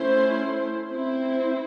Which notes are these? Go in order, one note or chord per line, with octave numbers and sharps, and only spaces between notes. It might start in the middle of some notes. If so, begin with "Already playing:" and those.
Already playing: A3 C#4 E4 C5
C4 E4 C5